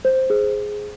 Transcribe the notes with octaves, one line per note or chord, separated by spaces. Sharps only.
C5
G#4